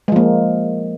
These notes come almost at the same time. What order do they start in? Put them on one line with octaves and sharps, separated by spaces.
G#3 F3 A#3